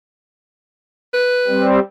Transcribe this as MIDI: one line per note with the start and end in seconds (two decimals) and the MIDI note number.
1.13 1.67 71
1.47 1.79 55
1.47 1.79 60